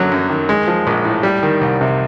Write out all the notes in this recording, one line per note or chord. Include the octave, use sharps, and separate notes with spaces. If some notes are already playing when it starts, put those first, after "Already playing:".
Already playing: F#2 D3 F#3
F#2
D#3
G#3
F3
A#1
A2
G3
D#3
C2
C3